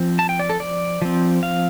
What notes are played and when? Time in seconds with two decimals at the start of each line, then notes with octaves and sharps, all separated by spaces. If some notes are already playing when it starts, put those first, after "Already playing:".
Already playing: F3 C4
0.19 A5
0.29 G5
0.39 D5
0.50 A4
0.60 D5
1.02 F3 C4
1.43 F5